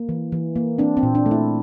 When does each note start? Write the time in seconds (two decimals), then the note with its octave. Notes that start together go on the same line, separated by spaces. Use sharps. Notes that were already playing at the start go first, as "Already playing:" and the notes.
Already playing: A#3
0.09 E3
0.32 E3
0.56 A#3
0.78 C4 D4
0.97 C4
1.03 A#2
1.15 D4
1.26 A3
1.31 E4